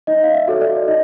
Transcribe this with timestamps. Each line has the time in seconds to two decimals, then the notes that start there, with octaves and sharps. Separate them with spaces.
0.07 D#4 D#5
0.23 F5
0.34 E5
0.48 F#4 A4 C#5
0.61 D5
0.88 D#4 D#5